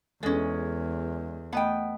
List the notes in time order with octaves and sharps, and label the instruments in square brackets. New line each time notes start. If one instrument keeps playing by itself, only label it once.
[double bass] E2 [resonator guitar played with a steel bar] G#3 C#4 [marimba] A4
[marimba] A3 D#5 B5 [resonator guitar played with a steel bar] B3 G5